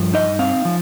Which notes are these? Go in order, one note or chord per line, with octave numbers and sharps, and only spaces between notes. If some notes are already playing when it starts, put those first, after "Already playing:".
Already playing: G2 F3
D#4 D#5
C4 F5
F3